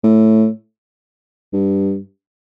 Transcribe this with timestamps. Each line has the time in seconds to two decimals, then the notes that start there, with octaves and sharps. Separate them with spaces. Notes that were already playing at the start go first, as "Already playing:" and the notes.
0.03 A2
1.53 G2